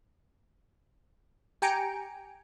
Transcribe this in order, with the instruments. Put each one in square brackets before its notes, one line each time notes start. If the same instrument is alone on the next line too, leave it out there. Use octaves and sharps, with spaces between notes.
[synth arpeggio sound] G4 G5 G#5 A#5 C#7 D7